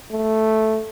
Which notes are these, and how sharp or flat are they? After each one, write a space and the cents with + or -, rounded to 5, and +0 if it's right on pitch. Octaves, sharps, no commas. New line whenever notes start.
A3 -5